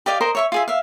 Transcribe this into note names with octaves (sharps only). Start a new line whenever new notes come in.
G4 D5 D#5 F5
A#4 C5 D#5
C#5 E5 C#6
F4 G#4 E5
E5 F5